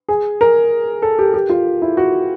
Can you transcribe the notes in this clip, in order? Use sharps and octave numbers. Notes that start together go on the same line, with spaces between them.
G#4
A#4
A4
G4
G4
F4
E4
F#4